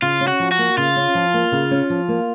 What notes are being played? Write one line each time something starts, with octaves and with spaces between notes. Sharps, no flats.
C#3 F4
C#4
F#4
F3
F#4
A#3
C#3 F4
C#4
F3
A#3
C#3
C#4
F3
A#3